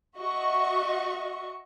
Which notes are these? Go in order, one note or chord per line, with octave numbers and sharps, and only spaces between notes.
F#4 D#5 E5 C#6